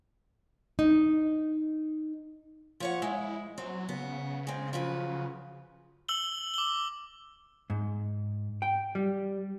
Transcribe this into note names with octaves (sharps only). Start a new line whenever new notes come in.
D#4
F3 C#5 F#5
G#3 E4
F#3 C4
C#3 B3
G#3 C4
F3 F#3 B4
E6 F#7 G7
D6 G7
G#2
G5
G3